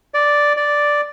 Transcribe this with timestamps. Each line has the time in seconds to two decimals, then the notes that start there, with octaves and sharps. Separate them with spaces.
0.14 D5
0.57 D5